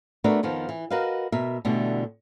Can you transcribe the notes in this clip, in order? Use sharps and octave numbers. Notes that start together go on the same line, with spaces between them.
A3 B3 D4 F#4 A#4 B4
F2 D#3 F3 B3
E3
F#4 A#4 B4 D#5 F5
B2 A#4 E5
B2 D3 E3 G3 A3